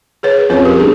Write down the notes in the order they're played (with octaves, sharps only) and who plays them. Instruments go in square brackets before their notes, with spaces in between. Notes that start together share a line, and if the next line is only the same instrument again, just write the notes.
[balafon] G#4 B4 C#5
[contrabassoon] F2 [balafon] C#4 B4 C#5
[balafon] G4 A#4
[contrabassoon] G1 [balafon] G#4